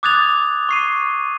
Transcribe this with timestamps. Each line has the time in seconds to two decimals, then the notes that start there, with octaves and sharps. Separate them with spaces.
0.03 D6 D#6 F#6 G#6 A6 F7
0.69 C#6 C7 D#7